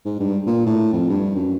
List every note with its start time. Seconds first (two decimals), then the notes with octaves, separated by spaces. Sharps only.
0.05 G#2
0.19 G2
0.46 A#2
0.66 A2
0.93 F2
1.09 G2
1.35 F#2